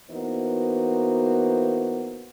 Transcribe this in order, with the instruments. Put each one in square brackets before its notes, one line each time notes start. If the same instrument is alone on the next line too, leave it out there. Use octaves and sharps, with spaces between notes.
[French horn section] E3 A#3 B3 D#4 F#4 C5